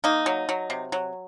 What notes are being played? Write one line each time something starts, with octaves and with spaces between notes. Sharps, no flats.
A#3 D#4
F#3
F#3
C3
F#3